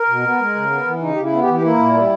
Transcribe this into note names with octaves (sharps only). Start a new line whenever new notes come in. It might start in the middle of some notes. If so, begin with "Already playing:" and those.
Already playing: A#4
B2
B3
G#3
C#3
B3
E3
C#3 D#4
C#3 G4
E4
B3
G4
E3
G4
A#3 E4
A#2
G3